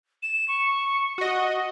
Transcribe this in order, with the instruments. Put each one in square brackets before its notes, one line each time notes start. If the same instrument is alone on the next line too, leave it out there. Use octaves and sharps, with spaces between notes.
[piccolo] E7
C#6
[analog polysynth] F#4 D#5